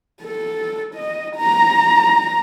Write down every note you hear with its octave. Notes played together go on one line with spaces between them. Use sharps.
A4
D#5
A#5